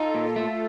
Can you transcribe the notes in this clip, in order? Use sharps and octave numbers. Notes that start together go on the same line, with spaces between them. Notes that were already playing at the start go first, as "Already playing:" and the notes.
Already playing: D#4 F4 A4
A#2
F4 A4
A3